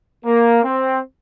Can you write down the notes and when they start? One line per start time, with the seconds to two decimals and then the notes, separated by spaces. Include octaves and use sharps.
0.25 A#3
0.64 C4